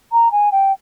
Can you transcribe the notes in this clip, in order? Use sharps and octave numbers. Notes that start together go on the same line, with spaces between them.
A#5
G#5
G5